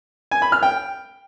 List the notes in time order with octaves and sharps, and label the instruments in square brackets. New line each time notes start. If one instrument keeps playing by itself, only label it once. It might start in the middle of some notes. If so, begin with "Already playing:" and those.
[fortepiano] G#5
B5
F6
G5